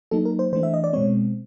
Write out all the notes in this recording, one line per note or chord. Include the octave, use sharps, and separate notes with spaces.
F#3 A#3 D#4 A4
A#4
C5
E3 A3 D4 C5
E5
D#5
D5
B2 G#3 C4 C#5